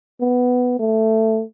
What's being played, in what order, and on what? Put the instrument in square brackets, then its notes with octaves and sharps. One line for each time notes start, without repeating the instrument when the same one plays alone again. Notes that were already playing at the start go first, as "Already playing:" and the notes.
[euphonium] B3
A3